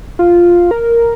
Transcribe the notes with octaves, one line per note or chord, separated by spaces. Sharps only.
F4
A#4